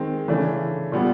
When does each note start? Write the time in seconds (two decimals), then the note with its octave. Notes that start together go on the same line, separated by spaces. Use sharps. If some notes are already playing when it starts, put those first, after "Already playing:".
Already playing: D#3 G#3 C4
0.28 C#3 E3 A3 D4
0.92 A#2 G3 B3